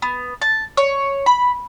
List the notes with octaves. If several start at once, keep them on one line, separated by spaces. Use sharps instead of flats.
B3
A5
C#5
B5